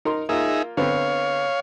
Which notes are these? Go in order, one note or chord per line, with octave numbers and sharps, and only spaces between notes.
D#4 A#4 C6
A#3 D#4 F4 G#4 E5
D3 B3 C4 C#5 F5